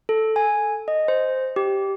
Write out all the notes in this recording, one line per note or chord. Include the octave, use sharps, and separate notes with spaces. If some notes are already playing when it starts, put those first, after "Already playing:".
A4
G#5
D#5
C5
G4